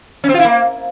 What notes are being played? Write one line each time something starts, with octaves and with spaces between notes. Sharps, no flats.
C#4
C4
F4
E4
A#3